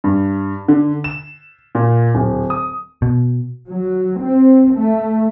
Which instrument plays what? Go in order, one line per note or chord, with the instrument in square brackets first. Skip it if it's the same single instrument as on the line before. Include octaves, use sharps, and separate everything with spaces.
[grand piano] G2
D3
E7
A#2
D1
D#6
[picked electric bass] B2
[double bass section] F#3
C4
A3